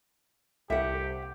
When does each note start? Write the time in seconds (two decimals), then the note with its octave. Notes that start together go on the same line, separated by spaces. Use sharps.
0.70 C2 G4 E5 F#5